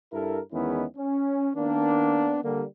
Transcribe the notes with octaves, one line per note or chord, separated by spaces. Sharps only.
G2 E4 A4 A#4
E2 D#3 G#3 B3 C#4 E4
C#4
D#3 A#3 B3 D4
D3 G3 A#3